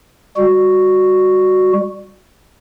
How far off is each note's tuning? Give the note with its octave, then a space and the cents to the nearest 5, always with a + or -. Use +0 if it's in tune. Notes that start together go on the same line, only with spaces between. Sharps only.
G3 +15 F#4 +0